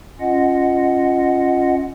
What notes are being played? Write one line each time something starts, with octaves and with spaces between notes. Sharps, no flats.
C#4 F4 D#5 F#5